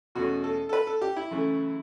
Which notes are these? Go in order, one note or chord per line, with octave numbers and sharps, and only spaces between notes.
E2 B2 A3 C#4 F#4
A4
A4
B4
A4
G4
E4
F#2 C#3 E3 A3